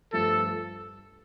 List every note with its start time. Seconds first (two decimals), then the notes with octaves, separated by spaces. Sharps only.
0.13 G2 F3 A3 A4